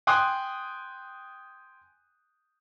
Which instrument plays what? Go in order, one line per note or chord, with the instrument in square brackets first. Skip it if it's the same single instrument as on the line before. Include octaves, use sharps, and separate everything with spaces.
[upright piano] G5 G#5 C6 D#6 F#6